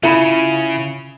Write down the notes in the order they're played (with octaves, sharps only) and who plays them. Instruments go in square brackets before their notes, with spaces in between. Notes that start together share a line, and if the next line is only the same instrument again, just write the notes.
[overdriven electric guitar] C#3 [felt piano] E4 F4 B5